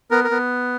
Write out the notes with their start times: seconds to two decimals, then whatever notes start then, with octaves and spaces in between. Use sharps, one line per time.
0.11 B3 A#4
0.24 A#4
0.31 B3